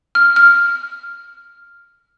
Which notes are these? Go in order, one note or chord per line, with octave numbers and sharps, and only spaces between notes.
F6
F6